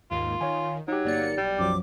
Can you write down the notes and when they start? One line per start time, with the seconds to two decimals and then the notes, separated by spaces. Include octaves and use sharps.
0.11 D#2 G#2 A#3 F4
0.41 D#3 C#5 F5 G#5
0.88 F#3 D#4 G4
1.05 G1 A#3 D5 C#7
1.37 B1 G3
1.59 F#2 F3 F#3 D6